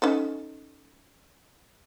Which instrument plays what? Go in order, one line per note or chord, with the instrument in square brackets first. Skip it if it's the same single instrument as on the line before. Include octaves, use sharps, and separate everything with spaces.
[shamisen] C#4 D#4 A4